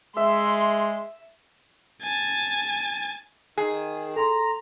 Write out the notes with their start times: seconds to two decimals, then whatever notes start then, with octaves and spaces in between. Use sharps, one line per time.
0.17 G#3 E5 C6
2.03 G#5 A5
3.58 D#3 G#4
4.16 A4 A#5 C6